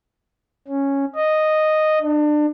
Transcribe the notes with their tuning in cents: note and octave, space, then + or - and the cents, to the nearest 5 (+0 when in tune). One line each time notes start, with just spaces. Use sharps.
C#4 -5
D#5 -5
D4 +30